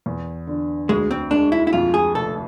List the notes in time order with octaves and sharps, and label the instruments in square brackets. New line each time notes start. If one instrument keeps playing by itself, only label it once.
[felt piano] E2
D3
[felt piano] D2 [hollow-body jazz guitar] G#3
[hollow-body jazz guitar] C4
[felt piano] G#3 [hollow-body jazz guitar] D4
[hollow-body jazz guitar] E4
E4
[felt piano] F2 [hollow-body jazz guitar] F4
[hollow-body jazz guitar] G#4
[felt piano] F1 [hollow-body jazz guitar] A4